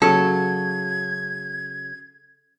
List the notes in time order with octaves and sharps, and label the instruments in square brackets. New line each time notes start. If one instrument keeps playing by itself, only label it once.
[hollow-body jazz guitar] C#3 F#3 [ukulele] A4 [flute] G#6